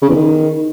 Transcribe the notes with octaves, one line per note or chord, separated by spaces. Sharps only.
C#3
E2
D#3